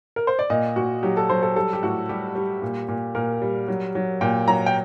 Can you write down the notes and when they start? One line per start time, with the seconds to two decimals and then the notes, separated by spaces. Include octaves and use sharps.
0.16 A#4
0.27 C5
0.39 D5
0.50 A#2 D#5
0.76 A#2 F#4
1.03 F#3 G4
1.17 A4
1.29 F#3 C5
1.43 A4
1.56 G3 A4
1.73 G4
1.83 A2 F#4
2.09 G3 G4
2.35 G3
2.62 A#2
2.88 A#2
3.15 A#2 A#4
3.42 G3
3.68 F#3
3.95 F#3
4.21 A#2 G5
4.47 F#3 A#5
4.66 G5